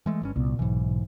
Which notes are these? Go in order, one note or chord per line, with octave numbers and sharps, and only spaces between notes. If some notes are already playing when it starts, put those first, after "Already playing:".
E3 G#3 A3
G1 G2 C#4
C2 A#2 B3
B1 G#2 E3